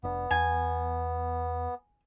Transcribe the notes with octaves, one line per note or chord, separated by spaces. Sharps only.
F1 B3 C#4 D4
E2 G#5